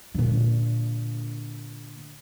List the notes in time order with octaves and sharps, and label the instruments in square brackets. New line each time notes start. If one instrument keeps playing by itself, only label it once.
[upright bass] A#2 D3